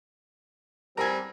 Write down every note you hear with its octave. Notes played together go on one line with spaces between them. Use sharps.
G3 C4 A#4 G#5